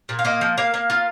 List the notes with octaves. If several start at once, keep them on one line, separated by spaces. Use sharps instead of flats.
A#2
F5
A#3 D#5
F3
A#3 F5
A#3
F4